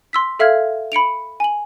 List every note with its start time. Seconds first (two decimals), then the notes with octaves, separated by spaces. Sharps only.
0.13 C6 E6 B6
0.40 A4 E5 F5 F6 G#6
0.92 B5 C#7 D7 F7
1.40 G#5 F#7